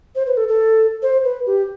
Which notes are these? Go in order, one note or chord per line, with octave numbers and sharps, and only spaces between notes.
C5
B4
A4
A4
C5
B4
G4